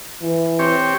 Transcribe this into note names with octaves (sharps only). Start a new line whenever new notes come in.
E3
C4 G4 C#5